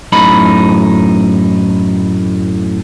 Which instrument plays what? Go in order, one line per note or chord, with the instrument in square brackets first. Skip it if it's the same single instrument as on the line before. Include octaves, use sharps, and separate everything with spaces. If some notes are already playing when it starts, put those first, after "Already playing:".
[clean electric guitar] F#2 A2 D#4 B5